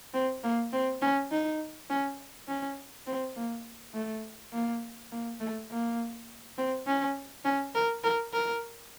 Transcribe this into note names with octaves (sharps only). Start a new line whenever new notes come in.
C4
A#3
C4
C#4
D#4
C#4
C#4
C4
A#3
A3
A#3
A#3
A3
A#3
C4
C#4
C#4
A#4
A#4
A#4